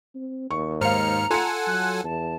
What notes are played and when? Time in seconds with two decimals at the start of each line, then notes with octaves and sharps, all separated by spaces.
0.15 C4
0.51 D#2 C#6
0.81 G#2 C5 F5 A#5 F6 C#7
1.31 F4 A4 F#5 G#5 C#7
1.67 F#3 F#6
2.04 E2 A5